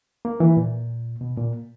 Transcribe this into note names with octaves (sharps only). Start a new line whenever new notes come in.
A#3
E3
A#2
B2
A#2